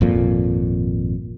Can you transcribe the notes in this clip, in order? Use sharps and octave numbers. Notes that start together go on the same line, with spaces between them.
G#1 F2 A#2